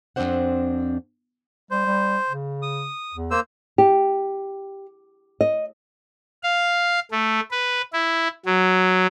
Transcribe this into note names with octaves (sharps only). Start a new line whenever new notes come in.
F2 A#3 C4 D4 C5 F#5
G3 C5
G3
C#3
D#6
E2
A#3 C5 E6
G4
D#5
F5
A3
B4
E4
F#3